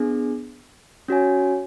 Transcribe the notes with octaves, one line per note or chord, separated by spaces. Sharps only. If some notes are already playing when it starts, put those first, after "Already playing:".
Already playing: B3 D4 G#4
C#4 F#4 C#5 G#5